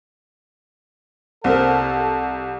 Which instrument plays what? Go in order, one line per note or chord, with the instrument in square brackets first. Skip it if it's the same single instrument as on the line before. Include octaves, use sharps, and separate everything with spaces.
[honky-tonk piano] C2 [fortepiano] C4 A#4 [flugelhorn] A4